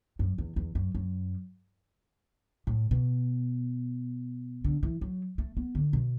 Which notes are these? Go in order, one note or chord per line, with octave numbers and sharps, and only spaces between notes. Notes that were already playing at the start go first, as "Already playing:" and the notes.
F#2
E2
E2
F#2
F#2
A2
B2
D3
E3
F#3
A3
B3
D3
B2